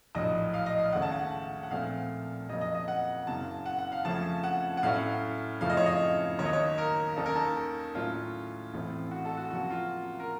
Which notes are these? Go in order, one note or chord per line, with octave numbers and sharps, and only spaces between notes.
A#1 A2 F#3 D#5
F5
D#5
F5
D#2 C#3 A3 C#4 F#5
A5
F#5
F#5
A#1 A#2 A3 C4 F5
F2 C#3 F#3 A#3 D#5
D#5
D#5
F#5
F#1 F#2 C#3 A5
F#5
F#5
F5
F2 C#3 F3 A3 C#4 A5
F#5
F#5
A2 F#3 A3 C#4 F5
F#1 F2 C#3 F3 A3 F5
D#5
C#5
D#5
D#2 D#3 F#3 A#3 C#5
D#5
C#5
A#4
D#2 D#3 A#3 C#4 A4
A#4
A4
A2 F#3 A3 C#4 F4
A1 A2 A3 C4
F#4
A4
F#4
F2 C#3 F#3 A#3 F#4
F4
A#4